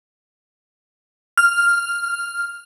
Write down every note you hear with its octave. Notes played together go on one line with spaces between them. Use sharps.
F6